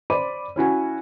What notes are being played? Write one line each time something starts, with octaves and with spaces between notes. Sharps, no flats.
C5 D5 B5 D6 D#7
C#4 E4 F#4 G#5